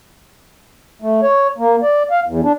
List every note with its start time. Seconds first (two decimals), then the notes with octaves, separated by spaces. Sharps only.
1.02 A3
1.23 C#5
1.58 A#3
1.82 D5
2.11 F5
2.26 E2
2.44 D4